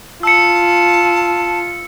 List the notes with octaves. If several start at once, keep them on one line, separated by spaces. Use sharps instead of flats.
F4 A5 E6 C#7